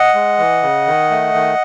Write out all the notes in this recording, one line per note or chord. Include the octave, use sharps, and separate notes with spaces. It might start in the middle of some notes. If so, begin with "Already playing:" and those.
Already playing: D#5 F#5
G#3
E3
C#3
D#3
A3
D#3